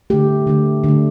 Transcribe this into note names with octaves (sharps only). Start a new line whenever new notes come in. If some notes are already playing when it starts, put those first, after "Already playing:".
D3 A3 G4
D3 A3
D3 A3